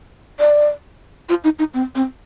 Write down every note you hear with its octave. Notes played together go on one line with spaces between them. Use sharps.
D5
F4
D#4
D#4
C4
C4